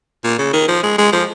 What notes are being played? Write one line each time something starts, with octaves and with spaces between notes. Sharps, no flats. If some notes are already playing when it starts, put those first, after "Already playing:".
A#2
C#3
D#3
F3
G#3
G#3
F3